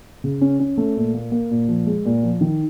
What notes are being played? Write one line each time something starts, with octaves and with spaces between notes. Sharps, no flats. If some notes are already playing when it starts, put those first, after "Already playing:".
C#3
C#4
C#4
A3
A#2
A#3
A#3
A#2
F3
G#3
A#2
F3
D#3